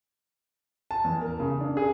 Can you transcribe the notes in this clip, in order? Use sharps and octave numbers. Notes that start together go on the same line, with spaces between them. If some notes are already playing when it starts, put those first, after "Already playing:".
A5
E2
A#4
C#3
D4
G#4